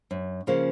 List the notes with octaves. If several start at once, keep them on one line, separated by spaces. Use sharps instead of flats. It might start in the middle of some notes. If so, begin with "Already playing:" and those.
F#2
C#3 F3 A#3 C#4